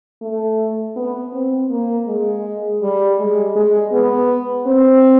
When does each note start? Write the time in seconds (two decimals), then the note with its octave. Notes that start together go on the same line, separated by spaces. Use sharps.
0.22 A3
0.96 B3
1.33 C4
1.70 A#3
2.07 G#3
2.82 G3
3.19 G#3
3.56 G#3
3.92 B3
4.67 C4